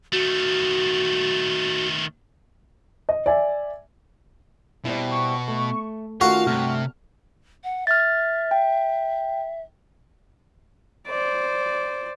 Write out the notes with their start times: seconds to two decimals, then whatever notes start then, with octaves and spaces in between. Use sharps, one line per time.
0.12 D#3 A3 F#4
3.09 D#5
3.26 D5 E5 G#5
4.85 B2 G3 C4 E4
5.11 C#6
5.48 A3
6.21 D#3 A3 C#4 F4 F#4 F5
6.47 G2 C3 A3 F6
7.64 F#5
7.87 E5 F6 A6
8.51 G5
11.08 C5 D5